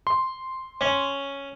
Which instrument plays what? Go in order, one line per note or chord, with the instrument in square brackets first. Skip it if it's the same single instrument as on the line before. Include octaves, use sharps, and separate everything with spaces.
[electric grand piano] C6
[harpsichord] C#4